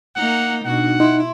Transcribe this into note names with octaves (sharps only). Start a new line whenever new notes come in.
A#3 D#4 F#5
B2 D4 D#4 F#4 F#5
D#4 E4 E5 C6